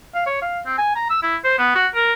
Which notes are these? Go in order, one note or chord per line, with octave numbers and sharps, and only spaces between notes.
F5
C#5
F5
C4
G#5
A#5
E6
E4
C5
B3
F#4
A#4